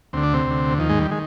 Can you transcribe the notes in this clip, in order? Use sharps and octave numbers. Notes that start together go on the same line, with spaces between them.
D2 D3 C4
D4
C3 C4
D2 D3
D#2 D#3 F3
G#2 G#3
G3
D#3 G#3